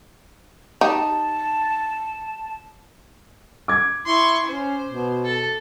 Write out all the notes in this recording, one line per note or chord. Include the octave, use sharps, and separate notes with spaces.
D#4 G4 A5
D6 G#6
E4 C6 C#6
C#4 C5
B2
A4